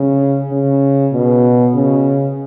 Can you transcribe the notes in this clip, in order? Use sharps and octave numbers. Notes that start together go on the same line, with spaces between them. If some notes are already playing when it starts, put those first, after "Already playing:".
Already playing: C#3
C#3
B2
C#3